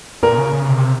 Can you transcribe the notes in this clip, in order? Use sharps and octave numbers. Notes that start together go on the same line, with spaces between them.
A#2 A#4
C#3
C#3
C3